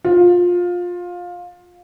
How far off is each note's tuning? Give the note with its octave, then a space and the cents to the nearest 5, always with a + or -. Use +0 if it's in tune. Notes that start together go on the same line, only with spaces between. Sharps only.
F4 +20